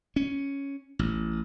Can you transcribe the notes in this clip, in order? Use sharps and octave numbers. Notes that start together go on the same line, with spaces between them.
C#4
A1